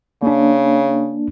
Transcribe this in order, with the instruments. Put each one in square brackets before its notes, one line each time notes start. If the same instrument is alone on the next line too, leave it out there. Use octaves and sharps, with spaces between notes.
[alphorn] C#3 [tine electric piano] A#3 D4